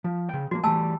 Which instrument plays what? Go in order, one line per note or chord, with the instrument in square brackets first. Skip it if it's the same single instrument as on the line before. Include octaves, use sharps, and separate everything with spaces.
[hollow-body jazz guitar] F3
C#3 G5
[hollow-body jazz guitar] F3 G3 A#3 [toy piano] F#4
[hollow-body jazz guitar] E3 G3 A3 [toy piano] G#5 A5 E6